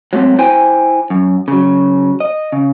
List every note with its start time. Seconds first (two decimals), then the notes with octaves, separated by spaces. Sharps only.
0.13 F#3 G#3 A3 C4
0.38 E4 C5 G5 G#5
1.10 F#2
1.48 C#3 F#3
2.20 D#5
2.52 C#3